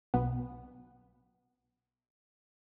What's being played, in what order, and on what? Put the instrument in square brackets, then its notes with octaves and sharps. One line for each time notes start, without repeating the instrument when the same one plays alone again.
[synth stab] B1 B3